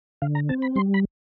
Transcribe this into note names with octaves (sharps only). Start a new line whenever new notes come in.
D3 F5
A#5
C4 A5
B5
G3 C6
B5